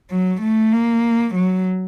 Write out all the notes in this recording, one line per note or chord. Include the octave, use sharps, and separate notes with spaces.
F#3
A3
A#3
F#3